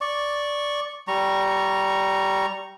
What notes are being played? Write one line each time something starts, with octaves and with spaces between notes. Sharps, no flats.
D5 C#6
G3 A#5 C#6